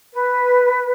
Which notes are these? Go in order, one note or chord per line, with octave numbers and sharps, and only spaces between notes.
B4